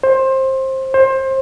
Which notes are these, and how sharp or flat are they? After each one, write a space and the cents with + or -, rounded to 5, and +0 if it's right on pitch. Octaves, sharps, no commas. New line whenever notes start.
C5 +20
C5 +25